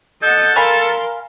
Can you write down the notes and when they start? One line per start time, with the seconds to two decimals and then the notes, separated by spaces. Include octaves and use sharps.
0.22 A4 D#5 F#5 G6
0.56 A#4 F5 G#5 B5 C6